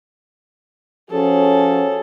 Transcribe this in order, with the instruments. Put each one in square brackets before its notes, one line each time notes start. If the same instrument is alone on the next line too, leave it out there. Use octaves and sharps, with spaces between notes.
[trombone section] F3 C#4 F#4 [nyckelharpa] G#4 A4